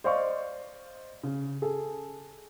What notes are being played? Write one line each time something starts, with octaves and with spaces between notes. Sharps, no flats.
C5 D5 D#5 F5 C6 C#6
C#3
G#4 A4